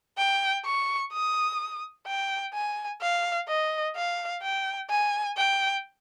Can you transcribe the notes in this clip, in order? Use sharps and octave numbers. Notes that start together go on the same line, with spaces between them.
G5
C#6
D#6
G5
G#5
F5
D#5
F5
G5
G#5
G5